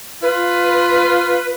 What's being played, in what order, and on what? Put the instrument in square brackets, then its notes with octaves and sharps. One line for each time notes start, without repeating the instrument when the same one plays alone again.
[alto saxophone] F4 [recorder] B4